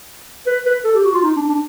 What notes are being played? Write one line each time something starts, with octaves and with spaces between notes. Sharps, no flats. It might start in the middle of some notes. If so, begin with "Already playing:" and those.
B4
B4
A4
G4
F#4
F4
D#4
D4
D4